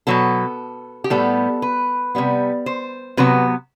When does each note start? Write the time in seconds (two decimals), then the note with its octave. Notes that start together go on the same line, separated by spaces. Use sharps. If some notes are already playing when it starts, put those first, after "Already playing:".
0.07 B2 F#3 B3 A4
1.04 G4
1.10 A2 G3 B3 A4
1.62 B4
2.15 C3 G3 B3
2.66 C5
3.17 C3 F#3 B3 B4